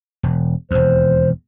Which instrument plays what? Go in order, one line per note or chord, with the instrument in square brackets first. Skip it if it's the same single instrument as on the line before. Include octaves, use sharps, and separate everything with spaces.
[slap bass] E1
[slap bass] E1 D#2 [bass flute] C5